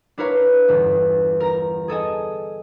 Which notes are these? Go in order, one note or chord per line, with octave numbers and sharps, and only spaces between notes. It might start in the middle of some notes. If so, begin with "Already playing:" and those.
D4 E4 A#4 B4 C#5 F5
G1 E2
A#4 A#5
G#4 A4 D#5 G#5